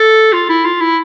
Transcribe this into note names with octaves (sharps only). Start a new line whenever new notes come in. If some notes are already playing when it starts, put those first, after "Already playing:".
Already playing: A4
F4
E4
F4
E4